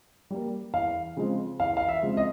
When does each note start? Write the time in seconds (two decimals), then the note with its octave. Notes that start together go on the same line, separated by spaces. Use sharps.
0.30 G3 A#3
0.73 E2 F5
1.17 C#3 F3 G#3 C4
1.59 E2 F5
1.77 F5
1.89 E5
2.02 C#3 F3 G#3 C4
2.17 D#5